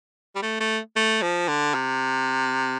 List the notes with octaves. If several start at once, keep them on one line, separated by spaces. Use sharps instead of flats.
G3
A3
A3
A3
F3
D3
C3